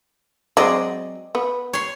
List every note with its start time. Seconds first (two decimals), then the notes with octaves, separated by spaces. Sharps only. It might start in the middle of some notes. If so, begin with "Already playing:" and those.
0.57 F#3 G#3 C4 D5 D#5
1.35 B3
1.73 C#5 C6